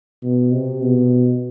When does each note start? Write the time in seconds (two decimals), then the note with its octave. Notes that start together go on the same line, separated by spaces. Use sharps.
0.23 B2
0.52 C3
0.82 B2